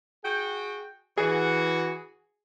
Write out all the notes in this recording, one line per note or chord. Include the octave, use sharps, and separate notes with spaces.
F#4 G#4 G5
E3 F#4 G#4